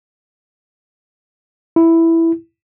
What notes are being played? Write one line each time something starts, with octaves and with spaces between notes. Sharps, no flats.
E4